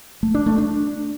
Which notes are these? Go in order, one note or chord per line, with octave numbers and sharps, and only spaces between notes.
A3
D4
A3
D4